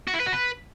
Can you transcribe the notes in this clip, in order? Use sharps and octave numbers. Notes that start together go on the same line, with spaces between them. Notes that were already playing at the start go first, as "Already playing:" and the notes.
F#4
E4
B4
F#4
B4